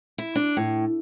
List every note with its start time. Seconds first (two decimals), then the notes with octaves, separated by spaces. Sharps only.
0.18 E4
0.35 D4
0.57 A2